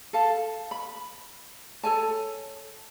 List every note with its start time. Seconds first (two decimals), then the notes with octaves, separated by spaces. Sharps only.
0.13 A4 F5 A5
0.71 B5
1.83 A4 C#5 G#5 A5